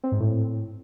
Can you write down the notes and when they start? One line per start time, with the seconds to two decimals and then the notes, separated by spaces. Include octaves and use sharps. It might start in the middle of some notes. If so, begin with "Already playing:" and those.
0.04 C4
0.12 G#2
0.20 A2